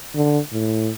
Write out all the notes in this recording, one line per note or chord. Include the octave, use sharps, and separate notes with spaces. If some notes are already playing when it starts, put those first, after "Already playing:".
D3
A2